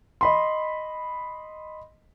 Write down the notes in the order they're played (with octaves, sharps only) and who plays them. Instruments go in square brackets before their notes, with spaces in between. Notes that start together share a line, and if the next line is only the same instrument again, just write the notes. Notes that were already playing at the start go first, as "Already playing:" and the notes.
[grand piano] D#5 B5 C6